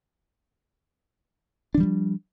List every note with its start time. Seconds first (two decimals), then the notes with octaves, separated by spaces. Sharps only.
1.75 D4
1.77 E3
1.80 G3
1.83 F3